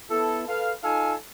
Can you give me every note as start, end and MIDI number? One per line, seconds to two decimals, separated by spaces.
0.10 0.44 59
0.10 0.44 64
0.10 0.44 69
0.48 0.71 69
0.48 0.71 71
0.48 0.71 77
0.84 1.14 63
0.84 1.14 65
0.84 1.14 69
0.84 1.14 77
0.84 1.14 80